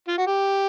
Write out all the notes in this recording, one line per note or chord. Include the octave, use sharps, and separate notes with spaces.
F4
F#4
G4